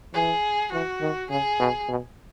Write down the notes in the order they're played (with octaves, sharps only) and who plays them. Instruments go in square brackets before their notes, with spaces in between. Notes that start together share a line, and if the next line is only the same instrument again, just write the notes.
[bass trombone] E3 [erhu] G#4
[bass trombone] E3 [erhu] F#4
[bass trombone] D#3
[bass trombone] C#3 [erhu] G#4
[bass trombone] B2
B2